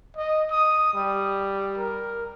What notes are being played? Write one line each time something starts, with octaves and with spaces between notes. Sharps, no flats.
D#5
D#6
G3
A#4